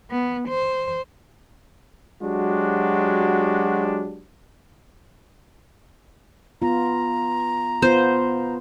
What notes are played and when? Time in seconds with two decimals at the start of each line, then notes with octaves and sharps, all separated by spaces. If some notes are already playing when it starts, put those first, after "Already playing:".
0.11 B3
0.49 C5
2.22 F#3 G#3 D4 F#4 G4
6.62 B3 F4 A#5
7.82 B3 F4 C5